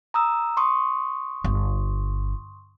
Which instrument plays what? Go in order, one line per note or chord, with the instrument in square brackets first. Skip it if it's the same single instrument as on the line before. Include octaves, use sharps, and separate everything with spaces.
[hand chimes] A#5 D#6 E6
C6 C#6 D#6
[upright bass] G1